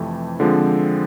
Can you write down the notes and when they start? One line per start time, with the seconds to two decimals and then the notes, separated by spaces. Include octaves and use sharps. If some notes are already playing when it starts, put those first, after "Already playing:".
Already playing: F2 C3 E3 A3
0.40 D3 F3 G#3 C4